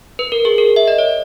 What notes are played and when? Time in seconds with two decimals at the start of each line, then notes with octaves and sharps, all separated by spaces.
0.19 B4
0.32 A#4
0.45 G#4
0.58 A#4
0.76 E5
0.88 D#5
0.98 C#5